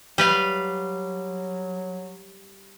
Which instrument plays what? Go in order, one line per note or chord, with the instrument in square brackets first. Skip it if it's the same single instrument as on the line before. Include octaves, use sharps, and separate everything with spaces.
[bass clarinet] F#3 [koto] G3 B4 F5